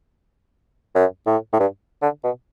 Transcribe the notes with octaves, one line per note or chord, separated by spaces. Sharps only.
F#2
A2
A2
G2
D3
B2